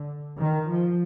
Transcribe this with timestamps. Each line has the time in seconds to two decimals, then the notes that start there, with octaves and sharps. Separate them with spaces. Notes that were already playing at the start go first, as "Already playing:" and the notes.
Already playing: D3
0.39 D#3
0.69 F3